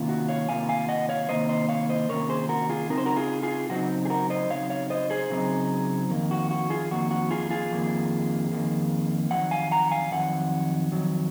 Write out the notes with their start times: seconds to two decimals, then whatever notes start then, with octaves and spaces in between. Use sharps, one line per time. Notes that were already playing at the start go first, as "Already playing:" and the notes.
Already playing: C3 D#3 A#3 C#4 F4
0.09 F#4
0.28 C#5 F5
0.49 C3 D#3 A#3 F4 F5 G#5
0.69 F5 G#5
0.89 D#5 F#5
1.09 C#5 F5
1.29 C3 D#3 A#3 C5 D#5
1.49 C5 D#5
1.69 C#5 F5
1.89 C5 D#5
2.09 C3 D#3 A#3 C#4 F4 A#4 C#5
2.29 G#4 C5
2.49 F#4 A#4
2.69 F4 G#4
2.89 C#3 F#3 C4 D#4 A#4
2.98 C5
3.05 F#4 A#4
3.16 F4 G#4
3.43 F4 G#4
3.69 C#3 F#3 C4 D#4 F#4
4.05 G#4
4.10 F#4 A#4
4.30 C5 D#5
4.49 C#3 F#3 C4 D#4 C#5 F5
4.70 C#5 F5
4.90 C5 D#5
5.10 G#4 C5
5.30 C#3 F#3 C4 D#4
6.10 F2 D#3 A#3
6.31 F#4
6.51 F#4
6.70 F4 G#4
6.91 F2 D#3 A#3 F#4
7.11 F#4
7.31 F4 G#4
7.51 F4 G#4
7.70 F2 D#3 A#3
8.52 F2 D#3 A#3
9.31 F2 D#3 F#3 F#5
9.51 F5 G#5
9.71 F#5 A#5
9.91 F5 G#5
10.11 F2 D#3 F#3 F#5
10.92 F2 D#3 F#3